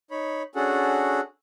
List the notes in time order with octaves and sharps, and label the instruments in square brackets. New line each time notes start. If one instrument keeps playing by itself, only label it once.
[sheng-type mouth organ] D#4 C#5 B5
C#4 D4 F#4 G#4 A4 F#5